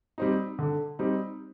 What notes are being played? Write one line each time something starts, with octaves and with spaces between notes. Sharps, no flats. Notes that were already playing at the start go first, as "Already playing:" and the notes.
G3 C4 D#4
D3
G3 C4 D#4